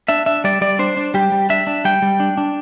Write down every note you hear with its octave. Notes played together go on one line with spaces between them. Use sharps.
D4 E5
D4 E5
G3 D5
G3 D5
D4 C5
D4
G3 G4
G3
D4 E5
D4
G3 G5
G3
D4
D4